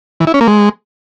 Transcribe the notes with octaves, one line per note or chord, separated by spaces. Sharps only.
E3
E4
C#4
A#3
G#3